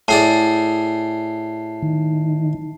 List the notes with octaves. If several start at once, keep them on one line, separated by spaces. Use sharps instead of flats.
A2 G#4 D5 A5 C7
D#3